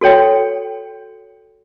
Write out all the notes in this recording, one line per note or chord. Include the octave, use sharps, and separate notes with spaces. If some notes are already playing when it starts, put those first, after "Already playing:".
F#4 A4 C#5 G5